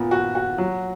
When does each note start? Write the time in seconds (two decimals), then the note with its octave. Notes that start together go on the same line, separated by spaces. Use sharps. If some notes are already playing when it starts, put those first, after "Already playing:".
Already playing: A#2 B3
0.11 F#4
0.35 F#4
0.58 F#3